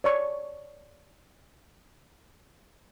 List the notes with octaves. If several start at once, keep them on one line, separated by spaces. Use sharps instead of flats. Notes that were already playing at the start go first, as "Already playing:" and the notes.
C#5 D5 C#6